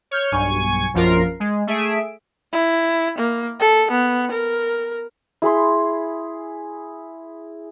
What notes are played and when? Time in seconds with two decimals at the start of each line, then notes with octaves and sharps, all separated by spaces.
0.11 C#5 F6 G6
0.32 B1 G2 G#5 C#6
0.94 A#1 F#2 F3 F4 A#4 C7
1.40 G#3
1.67 A3 G#4 E5 D7
2.53 E4
3.18 A#3
3.60 A4
3.91 B3
4.31 A#4
5.42 E4 G#4 B5 C6